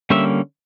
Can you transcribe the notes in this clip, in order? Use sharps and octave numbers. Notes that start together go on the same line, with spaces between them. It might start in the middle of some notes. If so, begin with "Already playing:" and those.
D3 G3 A#3 C#4 E5